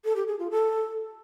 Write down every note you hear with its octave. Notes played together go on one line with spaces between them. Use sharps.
A4
G4
G#4
F4
A4